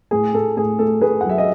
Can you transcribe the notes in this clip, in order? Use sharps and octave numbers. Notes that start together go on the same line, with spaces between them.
A2 G#4
A2 A4
A2 G#4
A3 A4
A3 G#4 B4
F#3 F#5
E5
D#5